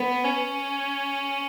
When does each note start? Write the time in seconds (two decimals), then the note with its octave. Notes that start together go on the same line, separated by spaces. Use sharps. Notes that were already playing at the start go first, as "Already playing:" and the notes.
Already playing: B3
0.25 C#4